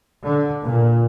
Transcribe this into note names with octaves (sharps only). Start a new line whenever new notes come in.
D3
A#2